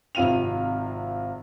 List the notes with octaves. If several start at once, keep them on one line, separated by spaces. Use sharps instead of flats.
G#1 C3 F4 D#7 F7